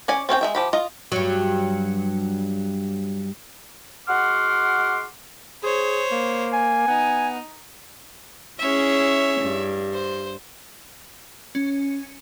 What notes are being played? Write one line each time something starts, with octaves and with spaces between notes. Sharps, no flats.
C#4 D5 G#5
C4 C#4 C5 G5
G#3 E5 G5
F3 G4 B5
F4 D#5
G2 F#3
G#3 F#4 F#5 C6 D6 F6
G#4 C5 C#5
A#3
G#5
B3 D#4
C#4 E4 G#4 C#5 E5
G2
C5
C#4